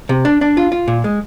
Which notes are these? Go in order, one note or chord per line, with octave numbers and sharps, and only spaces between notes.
C3
D4
D4
F4
F4
A#2
G#3